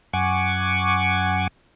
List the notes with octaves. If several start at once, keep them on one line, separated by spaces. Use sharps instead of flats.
F#2 F#5 G#5 C#6 D6